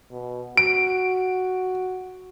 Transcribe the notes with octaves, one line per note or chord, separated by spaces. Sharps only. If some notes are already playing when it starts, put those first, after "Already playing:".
B2
F#4 D7